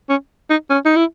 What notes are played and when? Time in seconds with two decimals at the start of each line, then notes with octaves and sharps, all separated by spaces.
0.10 C#4
0.50 D#4
0.70 C#4
0.85 D#4
0.96 E4